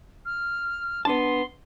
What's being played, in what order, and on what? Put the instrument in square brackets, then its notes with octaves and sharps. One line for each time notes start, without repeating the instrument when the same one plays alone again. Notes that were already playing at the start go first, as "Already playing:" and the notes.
[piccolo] F6
[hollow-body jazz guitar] B3 D4 A5 [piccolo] C6